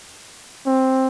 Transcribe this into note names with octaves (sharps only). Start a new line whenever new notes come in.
C4